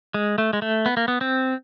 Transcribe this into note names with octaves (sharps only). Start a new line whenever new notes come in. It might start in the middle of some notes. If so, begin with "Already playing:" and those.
G#3
A3
G#3
A3
B3
A#3
B3
C4